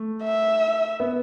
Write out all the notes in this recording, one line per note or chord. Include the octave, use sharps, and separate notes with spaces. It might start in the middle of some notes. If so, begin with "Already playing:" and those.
Already playing: A3
E5
B3